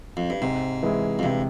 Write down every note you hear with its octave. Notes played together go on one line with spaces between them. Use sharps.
F2
G2
G#2 C3
E3 G#3 E4
F2
G2 C3